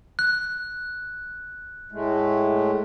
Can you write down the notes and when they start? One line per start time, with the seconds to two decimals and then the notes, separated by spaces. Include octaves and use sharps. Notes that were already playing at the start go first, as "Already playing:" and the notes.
0.19 F#6
1.92 A2 G#3 A3